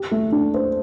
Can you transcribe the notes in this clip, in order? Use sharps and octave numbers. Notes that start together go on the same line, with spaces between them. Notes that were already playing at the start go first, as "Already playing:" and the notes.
Already playing: G4
A3
D4
C5